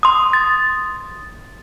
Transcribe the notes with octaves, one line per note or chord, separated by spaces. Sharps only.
C6 D#6
A6